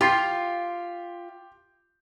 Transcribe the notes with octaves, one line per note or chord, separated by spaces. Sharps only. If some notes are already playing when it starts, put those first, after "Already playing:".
F4 G4 C6 C7